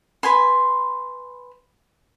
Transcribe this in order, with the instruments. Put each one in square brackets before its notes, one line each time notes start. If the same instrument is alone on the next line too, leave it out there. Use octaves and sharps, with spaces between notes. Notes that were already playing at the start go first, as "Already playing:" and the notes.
[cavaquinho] B4 G#5 C6